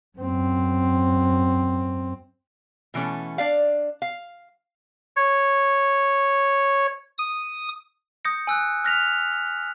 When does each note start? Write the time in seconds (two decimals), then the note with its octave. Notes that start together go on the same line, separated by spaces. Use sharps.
0.18 F#2 C4
2.94 B2 E3 A3 C#4 A4
3.38 D4 D5 F5
4.02 F5
5.16 C#5
7.18 D#6
8.25 D#6 G6 A#6 C#7
8.47 G#5 E6 F#6
8.84 F6 F#6 A#6 B6 F7